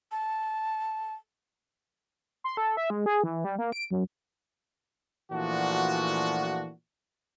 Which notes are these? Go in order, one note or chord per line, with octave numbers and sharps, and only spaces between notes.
A5
C6
A4
E5
G#3
G#4
E3
G3
A#3
D7
F#2
A#2 E3 F3 A3 D4 F#4